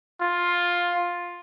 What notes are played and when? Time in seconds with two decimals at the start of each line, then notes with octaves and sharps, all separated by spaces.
0.21 F4